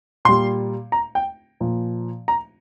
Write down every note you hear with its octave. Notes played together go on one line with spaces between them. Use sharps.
A#2 G3 C6
A#5
G5
A#2 F3
A#5